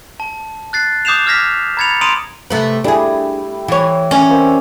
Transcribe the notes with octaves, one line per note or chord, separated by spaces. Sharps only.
A5
F#6 A6 C7
D6 D#6 G6 C7 E7 F7
D6 F6 G#6 A#6 B6
A#5 B5 G#6 A6 C#7 F7
A#5 C6 D#6 D7 D#7 F7
C3 A3 B4
G3 A3 D4 E4 G#4
E3 C#5
C#4 D5
A#3 C4 E6